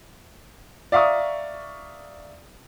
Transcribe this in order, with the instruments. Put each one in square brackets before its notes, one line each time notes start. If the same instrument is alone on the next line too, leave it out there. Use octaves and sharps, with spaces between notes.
[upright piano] D5 E5 F5 A#5 C#6 D#6